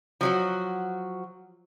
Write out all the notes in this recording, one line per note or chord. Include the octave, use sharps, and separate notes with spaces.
F3 F#3 F#4